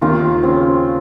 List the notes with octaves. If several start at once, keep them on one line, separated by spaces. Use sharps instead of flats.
D#2 D#3 F4
C#3 C4